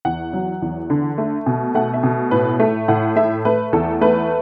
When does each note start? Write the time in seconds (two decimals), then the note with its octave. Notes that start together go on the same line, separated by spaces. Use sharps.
0.05 E2 F#5
0.33 F#3
0.62 E2
0.90 D3
1.18 A3
1.46 B2
1.75 A3 F#5
1.94 E5
2.03 B2
2.31 A2 B4
2.60 A3
2.88 A2 F#5
3.16 A3 E5
3.45 A3 B4
3.73 E2 A4
4.01 A3 B4